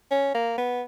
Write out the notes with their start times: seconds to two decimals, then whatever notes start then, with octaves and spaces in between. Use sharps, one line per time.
0.11 C#4
0.35 A#3
0.58 B3